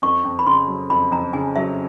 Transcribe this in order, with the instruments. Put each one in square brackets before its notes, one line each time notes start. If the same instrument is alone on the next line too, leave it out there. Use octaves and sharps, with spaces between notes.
[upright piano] F2 [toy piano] C#6
[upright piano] F2
[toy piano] B5
[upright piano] C#3 [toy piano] C6
[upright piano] F#3
[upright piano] F2 [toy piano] B5
[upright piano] F2 [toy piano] A#5
[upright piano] C#3 [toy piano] G#5
[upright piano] F#3 [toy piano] E5